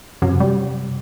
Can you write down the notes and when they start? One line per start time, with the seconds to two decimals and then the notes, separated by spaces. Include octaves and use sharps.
0.22 F#2 C3
0.40 G3